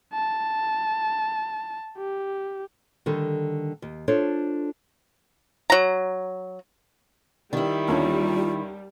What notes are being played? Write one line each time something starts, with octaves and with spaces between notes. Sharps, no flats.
A5
G4
D3 D#3 G3 A4
D#2
D4 F4 A4 C5 C#5
F#3 A#5
D#3 G3 E4
D#2 D3 C#4 F4